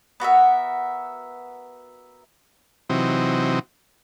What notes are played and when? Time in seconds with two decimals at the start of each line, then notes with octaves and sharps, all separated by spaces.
0.20 B3 F#4 A#4 E5
2.90 C3 E3 F#3 C4 D#4